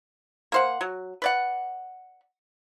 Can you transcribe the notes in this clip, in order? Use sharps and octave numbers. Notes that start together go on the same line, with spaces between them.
A#3 C5 F#5
F#3
B4 D5 F#5